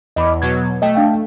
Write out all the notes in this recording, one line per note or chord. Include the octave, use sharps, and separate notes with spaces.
E2 D#5 B5 D6
B2 F#3 G#6
A3 D#5 G5
D4 F5 G5